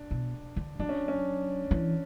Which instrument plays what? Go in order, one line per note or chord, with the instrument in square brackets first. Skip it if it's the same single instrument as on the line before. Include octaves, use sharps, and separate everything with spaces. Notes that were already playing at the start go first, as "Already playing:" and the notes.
Already playing: [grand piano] D4
[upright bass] B2
D3
[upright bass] F#3 [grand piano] D4
[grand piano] C#4
C#4
[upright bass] E3